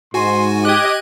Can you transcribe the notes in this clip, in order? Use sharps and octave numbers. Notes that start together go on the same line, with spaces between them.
G#2 F#4 G#5 C6
G4 D#5 D6 F#6 G#6